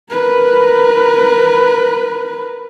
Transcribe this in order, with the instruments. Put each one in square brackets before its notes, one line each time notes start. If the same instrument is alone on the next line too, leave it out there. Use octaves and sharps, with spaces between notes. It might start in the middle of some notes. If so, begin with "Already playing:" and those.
[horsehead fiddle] A#4 B4